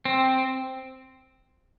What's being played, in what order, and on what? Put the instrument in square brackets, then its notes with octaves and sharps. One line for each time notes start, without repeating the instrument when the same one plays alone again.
[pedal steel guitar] C4